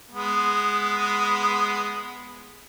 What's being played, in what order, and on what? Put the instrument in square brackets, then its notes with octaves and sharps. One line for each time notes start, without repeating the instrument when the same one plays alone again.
[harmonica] G#3 B3